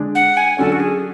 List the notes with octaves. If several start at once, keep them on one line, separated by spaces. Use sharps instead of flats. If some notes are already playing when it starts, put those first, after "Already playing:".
Already playing: D3 G#3 D4
F#5
G#5
D3 F#3 C#4 A4
F#4
G#4